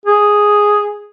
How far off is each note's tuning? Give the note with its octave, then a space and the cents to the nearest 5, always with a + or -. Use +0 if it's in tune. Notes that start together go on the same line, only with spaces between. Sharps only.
G#4 +0